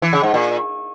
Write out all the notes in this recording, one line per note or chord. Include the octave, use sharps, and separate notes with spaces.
E3
C#3
G#2
A#2